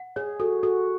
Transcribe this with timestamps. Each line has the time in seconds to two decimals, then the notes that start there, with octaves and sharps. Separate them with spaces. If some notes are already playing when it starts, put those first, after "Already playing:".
Already playing: F#5
0.16 G#4 C#5
0.40 F#4 A4
0.63 F#4 A4